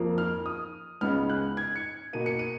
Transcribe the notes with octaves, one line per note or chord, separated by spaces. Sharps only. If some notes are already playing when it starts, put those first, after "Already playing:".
Already playing: F2 F3 A#3
F6
D#6
C#2 C#3 G#3 B3 F6
F#6
G#6
C#7
B2 A#3 D#7
C#7
D#7